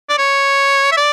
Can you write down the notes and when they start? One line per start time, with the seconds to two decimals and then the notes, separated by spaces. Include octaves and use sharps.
0.09 D5
0.18 C#5
0.92 E5
0.97 D5